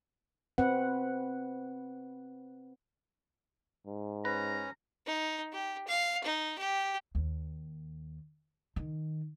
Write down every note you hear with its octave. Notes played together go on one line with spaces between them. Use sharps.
C4 B4 F#5
G#2
C#4 B4 A#5
D#4
G4
F5
D#4
G4
D#2
D#3